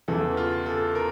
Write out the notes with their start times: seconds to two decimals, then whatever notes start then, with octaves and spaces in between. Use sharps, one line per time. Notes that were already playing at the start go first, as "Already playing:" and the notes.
0.08 E2 C#3 E3 A4
0.37 F4
0.66 A4
0.95 A#4